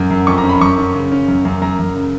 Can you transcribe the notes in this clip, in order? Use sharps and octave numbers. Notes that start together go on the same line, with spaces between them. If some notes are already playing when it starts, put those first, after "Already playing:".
Already playing: F#2
F#2
F2 C#6
A#5
C#4
B5
F#2 C#6
C#4
C#3
C#4
F#2
F#2
F#2 A#5
F#2
C#3